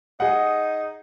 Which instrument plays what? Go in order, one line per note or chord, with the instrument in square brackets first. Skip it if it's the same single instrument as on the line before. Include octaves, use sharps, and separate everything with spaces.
[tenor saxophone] D#4 [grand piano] G#4 D#5 F#5